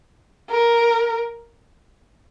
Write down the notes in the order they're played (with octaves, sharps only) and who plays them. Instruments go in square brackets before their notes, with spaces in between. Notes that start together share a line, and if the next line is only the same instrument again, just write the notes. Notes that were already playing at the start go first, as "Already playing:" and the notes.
[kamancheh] A#4